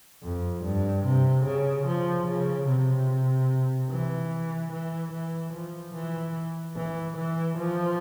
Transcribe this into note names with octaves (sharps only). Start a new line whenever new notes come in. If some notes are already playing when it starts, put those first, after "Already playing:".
F2
G2
C3
C#3
F3
C#3
C3
E3
E3
E3
F3
E3
E3
E3
F3